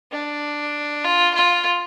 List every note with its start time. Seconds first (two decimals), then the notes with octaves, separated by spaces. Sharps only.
0.12 D4
1.04 F4
1.35 F4